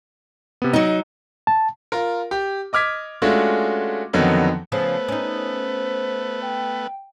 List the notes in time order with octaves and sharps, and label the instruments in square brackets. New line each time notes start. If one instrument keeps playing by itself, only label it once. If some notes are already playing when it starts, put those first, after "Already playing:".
[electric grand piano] C3 B3
[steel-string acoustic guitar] F#3 D#4 [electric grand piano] D#5
[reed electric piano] A5
[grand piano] F4 A#4
G4
D#5 D6 F6 G#6 B6
G#3 A3 C#4 D4 F4 F#4
F2 D3 D#3 F#3 B3 D#4
[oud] C#3 F3 C#4 [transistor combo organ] A3 B3 B4 [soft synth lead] C5
[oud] C#4 D#4
[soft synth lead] G5